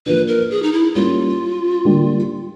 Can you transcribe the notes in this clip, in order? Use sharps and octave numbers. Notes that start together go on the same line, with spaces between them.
F3 A#3 D4 B4
A#4
G#4
D#4
E4
G3 A#3 C#4 F4
D3 G3 A#3 D4 G4